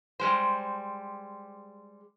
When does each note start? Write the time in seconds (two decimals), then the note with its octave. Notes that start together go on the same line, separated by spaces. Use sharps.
0.20 G3 G#3 C5